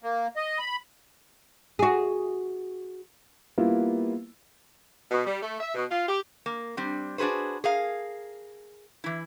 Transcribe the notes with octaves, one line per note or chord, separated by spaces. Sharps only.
A#3
D#5
B5
F#4 G#4
G3 A#3 B3 E4 F4
B2
G3
A3
E5
B2
F4
G4
A#3
G3 C4 D4
D4 F#4 G#4 B4 C5
G#4 A#4 F5
E3 E4